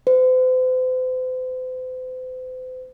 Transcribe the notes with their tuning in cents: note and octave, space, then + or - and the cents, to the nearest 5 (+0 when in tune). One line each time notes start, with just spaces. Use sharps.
C5 -40